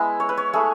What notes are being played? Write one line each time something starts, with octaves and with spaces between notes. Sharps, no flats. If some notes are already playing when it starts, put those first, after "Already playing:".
Already playing: G#3 B3 E4
C#5
B4
C#5
A3 E4 G#4